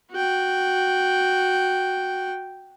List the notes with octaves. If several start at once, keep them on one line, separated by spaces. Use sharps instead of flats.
F#4 G5